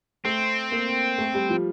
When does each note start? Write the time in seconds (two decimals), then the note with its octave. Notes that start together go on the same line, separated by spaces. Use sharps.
0.25 A3 C4
0.72 A#3
1.18 A3
1.34 G3
1.49 F3